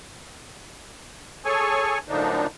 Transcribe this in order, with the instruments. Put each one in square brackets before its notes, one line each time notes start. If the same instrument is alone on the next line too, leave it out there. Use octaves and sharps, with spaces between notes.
[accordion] G#4 A4 C#5 G#5 C#6
F#2 A2 D3 F3 D4 D#4